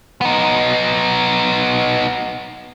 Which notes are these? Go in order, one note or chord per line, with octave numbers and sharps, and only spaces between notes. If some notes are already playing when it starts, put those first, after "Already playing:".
B3 D#4